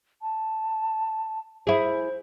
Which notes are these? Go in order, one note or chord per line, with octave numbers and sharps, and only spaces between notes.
A5
E4 G#4 C5